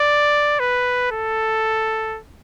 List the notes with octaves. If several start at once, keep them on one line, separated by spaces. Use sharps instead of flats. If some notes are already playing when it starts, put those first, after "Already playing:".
Already playing: D5
B4
A4